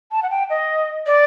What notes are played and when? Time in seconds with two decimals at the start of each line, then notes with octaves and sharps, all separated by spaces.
0.12 A5
0.23 F#5
0.30 G5
0.50 D#5
1.06 D5